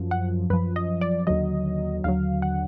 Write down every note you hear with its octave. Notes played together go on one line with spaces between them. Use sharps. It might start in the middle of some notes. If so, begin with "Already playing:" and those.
Already playing: F#2 F3
F#5
F#2 F3 B4
D#5
D5
D#2 D3 F#3 D#5
D#2 D3 F#3 F5
F#5